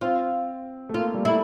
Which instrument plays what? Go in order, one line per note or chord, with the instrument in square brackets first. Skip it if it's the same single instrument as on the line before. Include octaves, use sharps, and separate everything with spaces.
[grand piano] C4 [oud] F4
[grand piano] A3
[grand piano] A#3 [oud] F4
[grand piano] G3
[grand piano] A3 [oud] E4